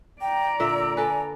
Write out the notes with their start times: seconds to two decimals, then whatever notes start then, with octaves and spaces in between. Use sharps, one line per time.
0.21 D5 G5 A#5
0.60 A#2 D3 E5 E6
0.97 A4 B4 G#5